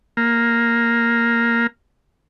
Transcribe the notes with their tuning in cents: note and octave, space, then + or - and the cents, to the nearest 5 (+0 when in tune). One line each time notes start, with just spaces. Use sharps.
A#3 +0